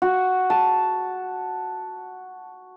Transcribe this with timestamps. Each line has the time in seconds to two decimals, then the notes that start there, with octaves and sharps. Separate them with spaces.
0.02 F#4
0.50 A5